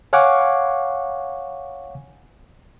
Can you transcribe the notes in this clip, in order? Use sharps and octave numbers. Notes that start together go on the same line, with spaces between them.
C#5 F5 F#5 G#5 C#6 D6